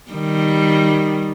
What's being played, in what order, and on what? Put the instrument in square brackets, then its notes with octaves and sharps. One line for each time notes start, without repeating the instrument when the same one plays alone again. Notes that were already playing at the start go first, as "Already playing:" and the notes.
[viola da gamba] D#3 G3